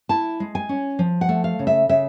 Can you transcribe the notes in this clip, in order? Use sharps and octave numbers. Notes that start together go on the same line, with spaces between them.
E4 A5
G#3
G#5
C#4
F3
F#5
A3
F5
C#3
E5
C#3 E5